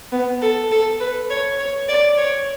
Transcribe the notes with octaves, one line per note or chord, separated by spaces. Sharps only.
B3
A4
A4
B4
C#5
C#5
D5
C#5